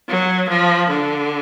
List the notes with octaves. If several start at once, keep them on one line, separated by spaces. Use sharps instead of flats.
F#3
F3
D3